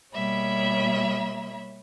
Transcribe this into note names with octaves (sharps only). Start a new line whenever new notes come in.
B2 G3 A#3 C#5 E5 B5